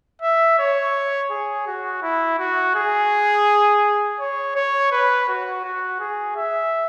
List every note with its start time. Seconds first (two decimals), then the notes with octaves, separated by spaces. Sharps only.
0.22 E5
0.59 C#5
1.31 G#4
1.67 F#4
2.02 E4
2.38 F#4
2.75 G#4
4.19 C#5
4.55 C#5
4.91 B4
5.28 F#4
5.64 F#4
6.00 G#4
6.36 E5